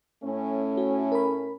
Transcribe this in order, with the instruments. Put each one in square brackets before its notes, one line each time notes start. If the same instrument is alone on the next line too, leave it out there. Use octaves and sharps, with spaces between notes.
[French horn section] A2 A3 C#4
[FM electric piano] F#4
A#4 B5